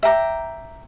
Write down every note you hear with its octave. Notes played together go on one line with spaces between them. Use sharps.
E5 G5 A#5 D6